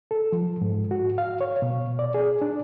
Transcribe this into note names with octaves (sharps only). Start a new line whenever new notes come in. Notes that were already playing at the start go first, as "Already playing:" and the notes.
A4
F3
G#2
F#4
F5
C#5
B2
D5
G#4
D4